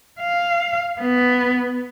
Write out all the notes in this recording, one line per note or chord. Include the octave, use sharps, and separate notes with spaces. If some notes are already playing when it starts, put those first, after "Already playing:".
F5
B3